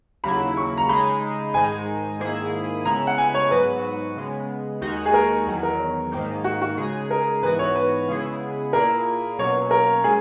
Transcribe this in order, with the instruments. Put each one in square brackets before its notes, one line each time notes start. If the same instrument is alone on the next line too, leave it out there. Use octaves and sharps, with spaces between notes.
[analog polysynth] D#2 C#3 F#3 A#3 E4 [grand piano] B5
[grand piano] C#6
A#5
[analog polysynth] C#3 G#3 D#4 G#4 [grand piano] B5
[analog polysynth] G#2 D#3 G#3 D#4 [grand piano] G#5
[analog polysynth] G#2 D#3 A#3 E4 G#4
[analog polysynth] C#3 G#3 B3 E4 [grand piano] A#5
[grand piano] F#5
G#5
C#5
[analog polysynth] G#2 F#3 B3 F#4 [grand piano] B4
[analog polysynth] C#3 G#3 B3
D#2 D#3 G#3 D#4 F#4
[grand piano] G#4
A#4
[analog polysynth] E2 D#3 F#3
[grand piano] A#4
[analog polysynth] G#2 D#3 A#3 D#4
[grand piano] F#4
F#4
[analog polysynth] C#3 G#3 D#4 G#4
[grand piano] A#4
[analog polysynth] G#2 E3 B3 F#4 [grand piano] B4
[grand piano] C#5
B4
[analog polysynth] C#3 G#3 B3 E4 G#4
[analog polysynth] A#2 A#3 E4 G#4 [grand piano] A#4
[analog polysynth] B2 F#3 A#3 C#4 [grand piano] C#5
[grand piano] A#4
[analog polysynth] G#3 C#4 [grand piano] G#4